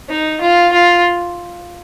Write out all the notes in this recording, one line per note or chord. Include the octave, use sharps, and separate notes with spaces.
D#4
F4
F4